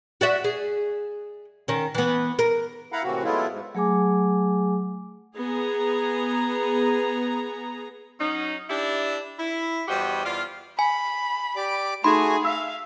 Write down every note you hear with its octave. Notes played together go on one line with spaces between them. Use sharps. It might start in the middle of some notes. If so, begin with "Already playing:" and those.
F#4 D5 E5
G#4
D#3 C#4
E3 B3
A#4
E4 F5 F#5 A#5 B5
A2 C3 E3 A#3 C4 F#4
F#3 G#3 A3 B3 E4 F4
G#2
F#3 A3 G#4 G#5 D6
B3 G#4 A#5
F#3 C#4 D#4
D4 E4 G4
E4
E2 G3 F#4 G4 C5 D#5
E2 F4 D5 F5
G#5 B5
G4 D5 D6
A3 D#4 F#4 G#4 G#5 B5 C6
E5 F5 E6